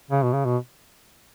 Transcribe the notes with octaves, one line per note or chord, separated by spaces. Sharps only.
C#3
B2
C#3
B2